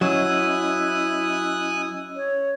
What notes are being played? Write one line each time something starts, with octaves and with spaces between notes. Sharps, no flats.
F#3 C#4 E4 D#5 G#5 D#6 E6 F#6
C#5